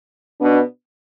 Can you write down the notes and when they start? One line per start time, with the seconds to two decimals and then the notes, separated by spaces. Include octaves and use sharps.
0.39 B2 B3 D4